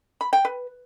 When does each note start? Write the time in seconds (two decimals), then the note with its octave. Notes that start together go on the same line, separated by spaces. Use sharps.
0.21 B5
0.33 G5
0.45 B4